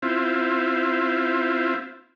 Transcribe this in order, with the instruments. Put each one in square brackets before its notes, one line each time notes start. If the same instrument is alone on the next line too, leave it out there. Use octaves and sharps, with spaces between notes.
[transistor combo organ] C4 E4 F4